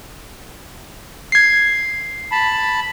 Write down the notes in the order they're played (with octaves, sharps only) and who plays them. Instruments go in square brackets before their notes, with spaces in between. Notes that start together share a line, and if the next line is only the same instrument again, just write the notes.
[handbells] G#6 C7
[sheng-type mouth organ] A5 B5